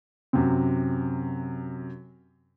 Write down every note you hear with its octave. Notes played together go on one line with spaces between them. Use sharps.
F#2 C3